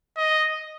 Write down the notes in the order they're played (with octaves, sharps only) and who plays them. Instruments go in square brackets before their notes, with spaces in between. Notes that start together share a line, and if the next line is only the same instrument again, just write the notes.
[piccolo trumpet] D#5